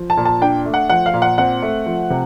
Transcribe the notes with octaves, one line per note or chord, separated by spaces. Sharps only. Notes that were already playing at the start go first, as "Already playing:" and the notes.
Already playing: F3
A5
A#2
A5
D4 G5
A3
F#5
F3 F#5
F5
A#2
F#5
C4 F#5
A3
F3
C3